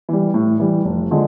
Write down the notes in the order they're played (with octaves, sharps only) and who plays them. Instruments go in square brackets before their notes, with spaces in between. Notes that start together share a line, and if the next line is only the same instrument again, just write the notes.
[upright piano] E3 G3
A2
E3 G3
F1
D3 F3 G#3